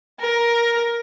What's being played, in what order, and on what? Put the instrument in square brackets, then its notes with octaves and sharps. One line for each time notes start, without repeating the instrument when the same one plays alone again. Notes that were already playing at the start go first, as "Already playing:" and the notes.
[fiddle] A#4